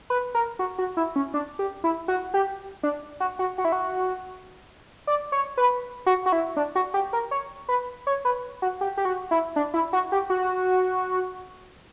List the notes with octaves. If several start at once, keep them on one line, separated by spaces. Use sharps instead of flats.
B4
A#4
F#4
F#4
E4
C#4
D4
G4
E4
F#4
G4
D4
F#4
F#4
F#4
E4
F#4
D5
C#5
B4
F#4
F#4
E4
D4
F#4
G4
A#4
C#5
B4
C#5
B4
F#4
G4
G4
F#4
E4
D4
E4
F#4
G4
F#4